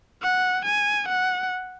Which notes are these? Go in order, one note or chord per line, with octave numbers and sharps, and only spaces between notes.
F#5
G#5
F#5